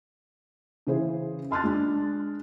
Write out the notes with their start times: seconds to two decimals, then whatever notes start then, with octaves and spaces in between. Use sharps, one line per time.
0.87 C#3 E3 G#4 C5
1.51 A5 C6 F6 F#6 A6
1.64 G#3 D4